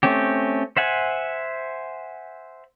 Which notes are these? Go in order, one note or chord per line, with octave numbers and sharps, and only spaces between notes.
A3 C4 C#4 G4
C5 E5 F#5 G#5